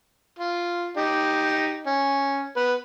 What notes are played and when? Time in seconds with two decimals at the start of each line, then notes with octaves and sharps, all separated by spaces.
0.39 F4
0.97 D#4 G4
1.86 C#4
2.56 B3 B4